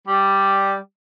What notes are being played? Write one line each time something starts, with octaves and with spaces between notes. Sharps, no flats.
G3